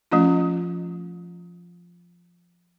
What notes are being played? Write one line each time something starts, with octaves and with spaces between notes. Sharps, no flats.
F3 A3 C#4 F4